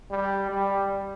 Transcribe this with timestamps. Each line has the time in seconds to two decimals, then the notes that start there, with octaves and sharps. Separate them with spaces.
0.11 G3
0.50 G3